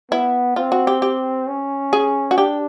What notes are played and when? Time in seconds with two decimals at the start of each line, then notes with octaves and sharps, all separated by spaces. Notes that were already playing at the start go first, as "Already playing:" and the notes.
0.11 B3 E4
0.56 C4 F4
0.72 F#4
0.87 G4
1.02 G4
1.47 C#4
1.93 G#4
2.31 F#4
2.38 D4 G4